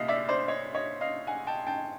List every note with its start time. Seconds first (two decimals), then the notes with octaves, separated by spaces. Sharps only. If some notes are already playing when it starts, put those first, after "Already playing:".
Already playing: C2 A#2 D#5 F5
0.08 D5 E5
0.29 C5 D5
0.48 C#5 D#5
0.74 C#5 D#5
1.01 D#5 F5
1.27 F#5 G#5
1.47 G5 A5
1.67 G5 A5